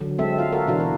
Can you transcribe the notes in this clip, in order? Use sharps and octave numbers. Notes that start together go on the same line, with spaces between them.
D3 F#3
F#3 G#3 C4 A4 E5
F4 F5
F#4 A4 A#4
B2 E3 D4 E4 F#4 F5
A#4